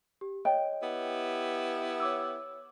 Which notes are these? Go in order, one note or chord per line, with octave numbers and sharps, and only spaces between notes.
G4
C#5 D#5 G5
B3 E4 G4
C#5 D6 E6